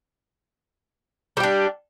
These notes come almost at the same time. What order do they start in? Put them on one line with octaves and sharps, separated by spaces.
G3 G4 D4